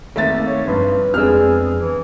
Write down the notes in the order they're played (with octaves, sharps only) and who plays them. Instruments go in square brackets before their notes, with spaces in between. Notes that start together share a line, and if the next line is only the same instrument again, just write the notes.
[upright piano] G#1 E5 A6 [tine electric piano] A3 A4 [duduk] A#3
[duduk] C#5
[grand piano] G2 [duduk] B4 [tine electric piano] C6
[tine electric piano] F2 C4 E6 [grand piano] G#3 B3 D4 [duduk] G#4 [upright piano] F6
[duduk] E3